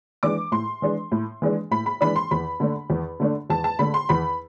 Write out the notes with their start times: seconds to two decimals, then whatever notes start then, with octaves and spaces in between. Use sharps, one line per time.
0.23 E3 G#3 D4 D6
0.52 A2 C6
0.82 E3 G#3 D4
1.12 A2
1.42 E3 G#3 D4
1.71 A2 B5
1.86 B5
2.01 E3 G#3 D4 B5
2.16 C6
2.31 E2 B5
2.60 D3 A3 D4
2.90 E2
3.20 D3 A3 D4
3.50 E2 A5
3.64 A5
3.79 D3 A3 D4 B5
3.94 C6
4.09 E2 B5